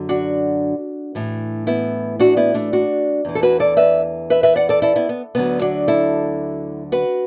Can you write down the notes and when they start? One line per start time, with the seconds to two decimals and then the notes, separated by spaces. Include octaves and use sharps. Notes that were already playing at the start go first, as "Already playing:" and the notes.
Already playing: F#2 D3 F#3
0.09 D4 F#4
1.15 A2 E3
1.67 B3 E4
2.20 D4 F#4
2.37 B3 E4
2.54 A3 D4
2.73 D4 F#4
3.25 E2 E3
3.35 A4
3.43 F#4 B4
3.60 A4 D5
3.77 B4 E5
4.30 B4 E5
4.43 B4 E5
4.56 D5 F#5
4.69 A4 D5
4.82 E4 A4
4.96 B3 E4
5.09 B3
5.35 D2 D3 F#3 B3
5.61 D4 F#4
5.88 E4 A4
6.92 F#4 B4